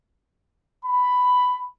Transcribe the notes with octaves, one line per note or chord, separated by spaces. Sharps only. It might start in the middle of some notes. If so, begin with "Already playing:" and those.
B5